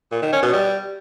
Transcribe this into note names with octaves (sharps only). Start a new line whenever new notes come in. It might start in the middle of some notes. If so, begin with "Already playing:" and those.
A#2
D#3
C#4
B2
G3